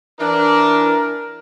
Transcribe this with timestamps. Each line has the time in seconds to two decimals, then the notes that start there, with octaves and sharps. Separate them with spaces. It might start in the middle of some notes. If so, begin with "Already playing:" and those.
0.20 E3 D4 A#4